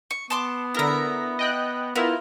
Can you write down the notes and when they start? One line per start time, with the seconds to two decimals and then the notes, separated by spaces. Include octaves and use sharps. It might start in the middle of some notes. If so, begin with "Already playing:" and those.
0.11 C#6
0.30 B3 A5 C6 D6
0.75 D3 E4 A#4 E5 A#6
1.39 D#5 G5 F#6
1.96 B3 E4 F4 A#4